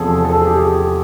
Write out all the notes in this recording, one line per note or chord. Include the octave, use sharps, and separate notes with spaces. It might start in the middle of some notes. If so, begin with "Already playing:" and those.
Already playing: E2 C3 F3 G#4 A4
A4
G#4
G4
G#4